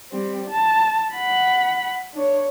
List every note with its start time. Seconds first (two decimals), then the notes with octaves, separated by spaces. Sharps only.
0.12 G3 C4
0.50 A5
1.15 F#5 B5
2.14 D4 C#5